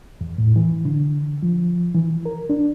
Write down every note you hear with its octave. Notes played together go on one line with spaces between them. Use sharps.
E2
A2
E3
D3
F3
E3
A#4
D4